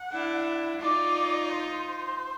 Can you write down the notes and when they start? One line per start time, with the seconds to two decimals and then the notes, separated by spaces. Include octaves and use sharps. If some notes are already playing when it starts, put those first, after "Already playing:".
Already playing: F#5
0.12 D4 E4
0.81 D#4 F4 D5
1.50 C5